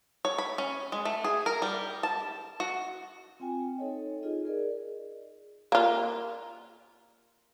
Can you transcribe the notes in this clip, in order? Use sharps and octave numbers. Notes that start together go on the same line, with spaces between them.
C#5
B5
C#4
G#3
A3
G#4
A#4
G3
A5
F#4
C4 F4 G5 G#5
D#4 A4 C#5 D#5
D#4 F4 G#4 D#5
G#4 A#4 D5
A#3 F4